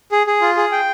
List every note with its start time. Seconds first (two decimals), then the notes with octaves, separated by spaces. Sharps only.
0.12 G#4
0.27 G#4
0.42 F4
0.57 G#4
0.72 G5